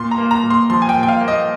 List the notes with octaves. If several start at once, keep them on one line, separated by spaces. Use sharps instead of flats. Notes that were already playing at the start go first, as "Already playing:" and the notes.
Already playing: A#2 C6
A#5
A#3
A#5
A#2
C6
F3 C6
G#5
G5
A#2
G5
F5
A#3
D#5